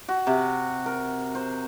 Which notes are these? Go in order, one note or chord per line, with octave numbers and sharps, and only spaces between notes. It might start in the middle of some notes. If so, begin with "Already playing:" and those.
F#4
C3
A#4
C5